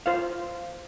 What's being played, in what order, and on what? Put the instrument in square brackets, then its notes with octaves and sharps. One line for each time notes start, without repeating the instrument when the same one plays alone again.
[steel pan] F4 C5 F5